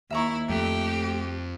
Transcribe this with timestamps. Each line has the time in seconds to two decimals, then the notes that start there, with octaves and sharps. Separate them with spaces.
0.10 D#2 E4 E5 A#5 C#6
0.49 F2 A3 G4